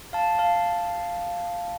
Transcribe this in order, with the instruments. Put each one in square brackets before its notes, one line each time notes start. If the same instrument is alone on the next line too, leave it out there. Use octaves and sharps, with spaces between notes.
[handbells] F5 A5
F5 A5